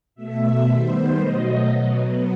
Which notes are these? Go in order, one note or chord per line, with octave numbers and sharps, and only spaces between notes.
B2 A3 E5
D#3 G3 B3 C5
B2 F#3 A3 D#5
B2 F#3 B3